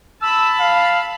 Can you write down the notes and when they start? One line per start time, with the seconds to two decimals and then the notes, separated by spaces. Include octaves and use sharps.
0.22 A5 B5 E6
0.60 F5